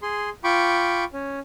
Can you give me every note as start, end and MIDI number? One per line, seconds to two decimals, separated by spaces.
0.02 0.29 68
0.02 0.29 84
0.44 1.04 65
0.44 1.04 79
0.44 1.04 83
0.44 1.04 85
0.44 1.04 86
1.13 1.39 61